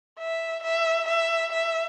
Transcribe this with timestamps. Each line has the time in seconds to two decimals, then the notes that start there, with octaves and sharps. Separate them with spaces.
0.19 E5
0.63 E5
1.08 E5
1.53 E5